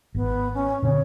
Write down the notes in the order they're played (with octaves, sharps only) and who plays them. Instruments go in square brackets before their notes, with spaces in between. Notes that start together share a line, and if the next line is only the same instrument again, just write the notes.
[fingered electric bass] G#1 [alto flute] B3
[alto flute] C#4
[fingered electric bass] A#2 D3 C4 [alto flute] C#5